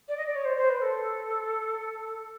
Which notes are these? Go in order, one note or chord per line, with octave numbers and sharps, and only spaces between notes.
D5
D#5
D5
C#5
C5
C5
B4
A4